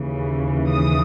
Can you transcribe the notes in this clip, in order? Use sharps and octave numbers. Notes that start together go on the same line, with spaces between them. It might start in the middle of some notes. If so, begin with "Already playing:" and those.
Already playing: D#2 C#3 E3
D#6